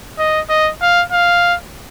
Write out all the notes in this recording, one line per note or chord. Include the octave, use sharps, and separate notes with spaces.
D#5
D#5
F5
F5